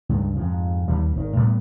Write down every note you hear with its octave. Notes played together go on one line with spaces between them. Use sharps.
C#2 G2
F2 G#2 F3
D#2 G3
G#1 D#3
A2 G3 B3